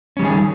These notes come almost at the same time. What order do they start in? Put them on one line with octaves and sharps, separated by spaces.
C#4 G3 D#3 G#4